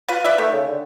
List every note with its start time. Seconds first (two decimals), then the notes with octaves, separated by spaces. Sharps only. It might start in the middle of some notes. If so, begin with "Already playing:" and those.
0.08 F4 B4
0.24 B4 D5 E5
0.38 D#3 A3
0.53 C#3
0.67 D3